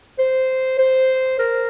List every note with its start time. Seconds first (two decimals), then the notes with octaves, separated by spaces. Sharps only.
0.19 C5
0.79 C5
1.39 A#4